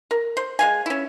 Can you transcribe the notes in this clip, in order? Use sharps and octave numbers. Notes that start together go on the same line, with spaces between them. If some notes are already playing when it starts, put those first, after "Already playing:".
A#4
C5
G#3 F5 G#5
C#4 E4